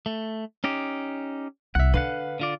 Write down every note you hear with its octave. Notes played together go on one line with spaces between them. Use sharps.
A3
C#4 D#4 G4
C2 E5 F#5
D3 B4 F5 F#5
D3 F4 D5